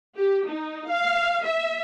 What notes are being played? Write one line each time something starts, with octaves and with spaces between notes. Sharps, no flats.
G4
D#4
F5
E5